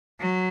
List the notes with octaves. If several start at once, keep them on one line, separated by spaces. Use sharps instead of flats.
F#3